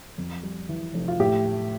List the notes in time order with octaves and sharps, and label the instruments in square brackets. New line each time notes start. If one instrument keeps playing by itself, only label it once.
[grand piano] F2
G3
E3
F1
F4
A2 G4
A3